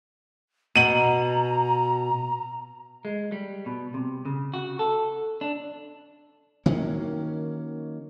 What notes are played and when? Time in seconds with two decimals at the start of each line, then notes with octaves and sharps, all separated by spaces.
0.76 B2 A#5 D#7 F#7
3.05 G#3
3.32 G3
3.66 B2
3.94 C3
4.25 C#3
4.54 F#4
4.79 A4
5.41 D4
6.66 D#3 F#3 A#3 C#4